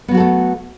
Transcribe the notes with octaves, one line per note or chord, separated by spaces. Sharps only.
F#3 A3 B3 F#4 A4